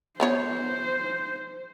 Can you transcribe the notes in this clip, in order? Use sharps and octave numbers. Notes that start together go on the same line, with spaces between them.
F3 B3 C5 C#5